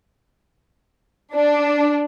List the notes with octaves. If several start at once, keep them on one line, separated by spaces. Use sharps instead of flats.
D4